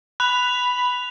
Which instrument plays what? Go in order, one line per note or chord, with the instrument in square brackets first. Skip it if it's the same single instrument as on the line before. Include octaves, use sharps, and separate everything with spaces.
[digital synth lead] B5 [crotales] F#6 F7